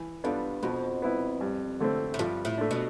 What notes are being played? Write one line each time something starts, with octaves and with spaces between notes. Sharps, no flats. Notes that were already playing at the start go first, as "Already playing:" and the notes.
Already playing: E3
G2 B3 D4 F4 A4
F2 B2
B3 E4 B4
G2
D3 A3 C4
A2
G2 F3
A2
A3 D4
B2